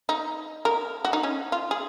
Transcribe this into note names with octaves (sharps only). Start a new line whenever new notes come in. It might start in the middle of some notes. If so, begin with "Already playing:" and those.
D#4
A#4
F#4
D#4
C#4
F4
G#4